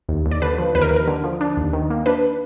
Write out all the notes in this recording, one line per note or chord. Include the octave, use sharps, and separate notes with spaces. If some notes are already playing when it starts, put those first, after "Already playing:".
D#2
D#2
D5
D3 B4
F3
D#2 B4
A#4
D#2
A#4
D3
F3
D4
D#2
D#3
A#3
D4 B4